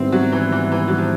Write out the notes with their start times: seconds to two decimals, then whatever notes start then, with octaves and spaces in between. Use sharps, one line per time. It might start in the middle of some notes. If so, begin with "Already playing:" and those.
Already playing: G#2 D#3 G3 B3 C4 E4
0.12 F#3
0.32 E3
0.52 E3
0.72 E3
0.88 F#3
0.98 F3